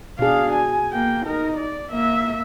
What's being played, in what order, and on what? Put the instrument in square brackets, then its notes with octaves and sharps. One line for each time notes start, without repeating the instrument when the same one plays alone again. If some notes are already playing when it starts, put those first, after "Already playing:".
[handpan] B2 G#4 [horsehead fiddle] D4 F5
[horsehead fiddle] G#5
A#3 G5
D#4 A#4
D5
A#3 E5